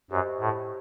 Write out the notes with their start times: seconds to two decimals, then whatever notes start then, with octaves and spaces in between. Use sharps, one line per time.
0.11 F#2 G4 C5 D#5
0.40 A2